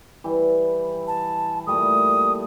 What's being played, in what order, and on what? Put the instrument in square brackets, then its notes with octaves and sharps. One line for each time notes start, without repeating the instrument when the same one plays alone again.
[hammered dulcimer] E3 G3
[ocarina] A5
[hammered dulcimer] A#2 G3 A3 [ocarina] D#6